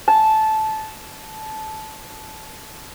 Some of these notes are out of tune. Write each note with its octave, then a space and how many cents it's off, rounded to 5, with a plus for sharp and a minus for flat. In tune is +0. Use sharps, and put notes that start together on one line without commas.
A5 -15